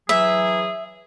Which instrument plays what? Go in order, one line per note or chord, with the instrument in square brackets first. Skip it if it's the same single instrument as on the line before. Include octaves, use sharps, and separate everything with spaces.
[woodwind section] E3 F#3 G#4 [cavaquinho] E5